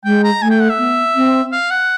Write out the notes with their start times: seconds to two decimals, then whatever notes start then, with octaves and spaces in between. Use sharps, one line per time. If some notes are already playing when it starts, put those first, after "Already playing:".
0.05 G#3 G5
0.24 A#5
0.42 A3 G#5
0.50 G5
0.61 F#5
0.69 E5
0.78 B3
1.15 C4
1.52 F5
1.71 F#5